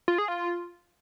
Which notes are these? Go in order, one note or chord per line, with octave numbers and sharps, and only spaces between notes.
F4
G#4
F4